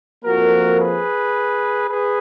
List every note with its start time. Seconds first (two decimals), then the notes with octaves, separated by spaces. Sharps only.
0.25 F2 F3 A#3 F#4 A#4
0.79 G#4 B4
1.89 G#4 B4